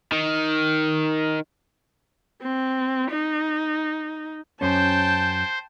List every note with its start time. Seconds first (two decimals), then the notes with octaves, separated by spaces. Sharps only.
0.12 D#3
2.42 C4
3.11 D#4
4.61 F#2 C#4 C5 G5 A5